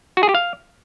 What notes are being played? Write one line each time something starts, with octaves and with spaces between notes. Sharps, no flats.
F#4
G#4
G4
F5